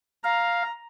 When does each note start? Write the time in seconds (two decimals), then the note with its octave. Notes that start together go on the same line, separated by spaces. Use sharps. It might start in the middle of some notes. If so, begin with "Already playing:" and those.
0.24 F5 A#5